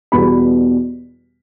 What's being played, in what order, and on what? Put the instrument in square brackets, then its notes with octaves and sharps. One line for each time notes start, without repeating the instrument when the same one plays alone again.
[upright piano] E2 B2 G3 B3 B5